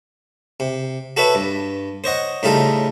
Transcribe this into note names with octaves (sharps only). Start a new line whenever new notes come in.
C3
F#4 A4 B4 C#5 E5
G2
C5 C#5 D#5 F#5
A2 C#3 G3 D#4 F4 A4